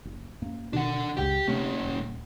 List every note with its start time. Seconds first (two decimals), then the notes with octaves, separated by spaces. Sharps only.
0.05 F#1
0.42 F#2 A#3
0.73 B2 D#3 D4 F#5
1.17 C#2 F#2 C#3 G4 G5
1.47 C3 A3 A#3 C#4
1.83 D#1